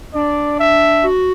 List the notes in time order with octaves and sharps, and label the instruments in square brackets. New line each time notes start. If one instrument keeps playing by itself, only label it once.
[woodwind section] D4 [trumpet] D5
[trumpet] E5
[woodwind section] F#4